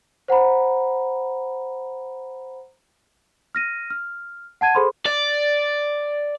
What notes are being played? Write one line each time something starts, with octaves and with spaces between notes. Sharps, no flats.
C5 F#5 A#5 B5
F6 A#6 D#7
F6
F#5 A5 G#6 D#7
G#4 A4 C5 B5 C6
D5